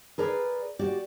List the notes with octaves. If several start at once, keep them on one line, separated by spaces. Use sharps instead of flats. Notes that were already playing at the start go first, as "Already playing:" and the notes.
G#4 A#4 B4 D5
F#4 G4 D5